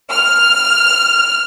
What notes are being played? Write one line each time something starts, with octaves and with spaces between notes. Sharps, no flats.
F6